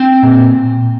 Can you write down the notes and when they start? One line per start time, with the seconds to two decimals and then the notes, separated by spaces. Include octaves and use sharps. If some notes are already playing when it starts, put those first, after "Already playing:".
Already playing: C4 G5
0.23 A#2